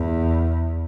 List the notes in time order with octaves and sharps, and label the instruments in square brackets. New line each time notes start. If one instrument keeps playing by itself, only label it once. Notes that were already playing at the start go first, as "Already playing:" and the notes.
Already playing: [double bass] E2